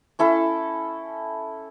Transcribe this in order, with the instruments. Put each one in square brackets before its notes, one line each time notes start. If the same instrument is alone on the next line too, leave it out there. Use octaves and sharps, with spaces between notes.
[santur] C#4 E4 A4 A5